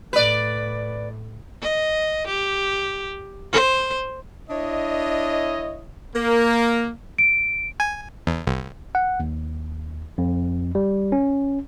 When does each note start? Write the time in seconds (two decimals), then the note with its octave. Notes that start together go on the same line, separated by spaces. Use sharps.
0.13 A2 B4 D5
1.62 D#5
2.28 G4
3.53 C5
4.49 D4 E4 C#5 D#5
6.15 A#3
7.18 D7
7.80 G#5
8.27 E2
8.47 C2
8.95 F#5
9.20 D#2
10.18 F2
10.75 G3
11.12 C#4